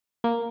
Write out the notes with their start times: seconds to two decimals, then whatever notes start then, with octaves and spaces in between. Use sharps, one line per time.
0.24 A#3